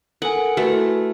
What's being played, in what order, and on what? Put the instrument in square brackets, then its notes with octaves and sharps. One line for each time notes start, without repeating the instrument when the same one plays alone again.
[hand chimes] A4 A#4 G#5 [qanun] F#5
[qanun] A3 [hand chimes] E4 F#4 B4